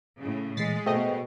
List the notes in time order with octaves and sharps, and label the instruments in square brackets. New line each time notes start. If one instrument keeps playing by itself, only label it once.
[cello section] A2 C#3
[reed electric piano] A#2 E3 G#4 [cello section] G#3 [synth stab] A6 B6 C7
[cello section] B2 [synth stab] A3 D#5 [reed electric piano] G#4 C5 G5